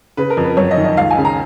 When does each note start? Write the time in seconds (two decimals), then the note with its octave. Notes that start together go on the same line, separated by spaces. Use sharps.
0.17 C#3 B4
0.30 A#4
0.37 F2
0.44 B4
0.57 F#2 C#5
0.71 D#5
0.77 D#3
0.84 D#5
0.97 C#2 F5
1.11 G#5
1.18 C#3
1.25 A#5